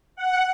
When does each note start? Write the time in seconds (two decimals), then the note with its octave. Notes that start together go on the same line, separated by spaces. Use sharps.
0.16 F#5